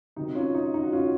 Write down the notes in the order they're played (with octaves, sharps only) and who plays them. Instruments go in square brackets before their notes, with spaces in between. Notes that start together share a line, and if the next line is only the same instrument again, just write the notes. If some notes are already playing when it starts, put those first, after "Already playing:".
[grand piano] C3 D#3 F#3 D#4
C#4 F4
D#4
D#4
F#4
C#4 F4